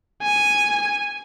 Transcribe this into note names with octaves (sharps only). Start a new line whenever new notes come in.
G#5